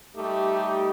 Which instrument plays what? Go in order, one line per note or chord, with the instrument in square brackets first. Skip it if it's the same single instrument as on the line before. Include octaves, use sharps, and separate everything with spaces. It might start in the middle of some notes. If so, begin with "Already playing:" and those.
[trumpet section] G3 D#4 G4 [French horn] A3